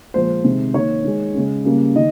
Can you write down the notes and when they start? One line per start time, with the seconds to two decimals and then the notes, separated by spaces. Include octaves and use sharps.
0.14 A#2 F3 G#3 C5
0.44 C3 D#3 G#3
0.74 D#3 A#3 C#5
1.04 D#3 G#3
1.34 C#3 G#3
1.65 C#3 G3 A#3
1.96 D#3 D#5